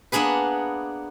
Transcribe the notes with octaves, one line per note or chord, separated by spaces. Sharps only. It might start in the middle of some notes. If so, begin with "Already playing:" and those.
A#3 B3 D4 G#4 B4